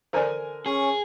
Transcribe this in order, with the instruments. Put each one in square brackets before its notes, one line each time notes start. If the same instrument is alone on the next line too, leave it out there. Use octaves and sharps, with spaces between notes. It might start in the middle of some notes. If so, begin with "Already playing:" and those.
[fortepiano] D3 A#4 G#5 [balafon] C5 D5
[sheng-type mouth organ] C#4 C#5 [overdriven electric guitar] G#4